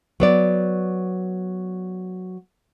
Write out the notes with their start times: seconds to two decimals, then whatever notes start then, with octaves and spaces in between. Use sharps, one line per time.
0.20 F#3 B3 D5